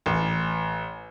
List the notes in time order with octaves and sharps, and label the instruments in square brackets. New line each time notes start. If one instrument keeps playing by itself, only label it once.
[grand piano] A1